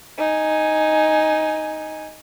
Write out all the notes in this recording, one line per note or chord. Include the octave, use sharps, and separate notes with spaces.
D#4 G#5